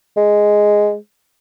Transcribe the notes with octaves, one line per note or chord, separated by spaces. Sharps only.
G#3